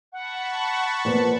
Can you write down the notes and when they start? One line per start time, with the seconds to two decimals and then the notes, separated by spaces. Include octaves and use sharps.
0.12 F#5 A5 B5 C#6
1.05 A#2 F3 B3